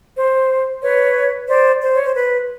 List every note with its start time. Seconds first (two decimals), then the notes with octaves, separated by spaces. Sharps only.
0.17 C5
0.82 B4 C#5
1.48 C5 D5
1.82 C5
1.94 C#5
2.04 C5
2.15 B4